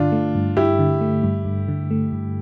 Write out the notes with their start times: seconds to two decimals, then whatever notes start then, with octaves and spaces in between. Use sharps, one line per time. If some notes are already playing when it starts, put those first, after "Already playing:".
Already playing: G2 D3 D4 F4
0.12 A3
0.35 G2
0.57 G2 E4 G4
0.79 D3
1.01 A3
1.23 G2
1.45 G2
1.68 D3
1.91 A3
2.12 G2